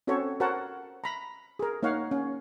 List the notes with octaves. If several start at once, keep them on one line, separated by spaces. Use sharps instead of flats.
C4 C#4 F#4 A4 C5 C#5
F#4 A#4 C5 C#5 F#5 A5
A#5 B5
G#4 A#4
A#3 D#4 C#5 F5 F#5
C#4